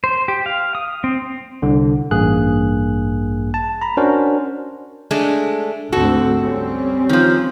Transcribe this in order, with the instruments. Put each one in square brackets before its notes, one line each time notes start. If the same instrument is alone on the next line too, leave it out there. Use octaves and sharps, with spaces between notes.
[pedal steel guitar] C5
G4
F5
D#6
C4
[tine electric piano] C2 D3
A1 G2 A#3 G#4 F#6
A5
A#5 B5
C#4 D4 F#4 A#4 C5
[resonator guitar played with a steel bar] G#3 A3 D4
[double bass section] G#1 D2 C4 [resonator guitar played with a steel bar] F#4 A4
[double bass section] G3 C4 C#4
[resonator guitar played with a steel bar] D#3 F3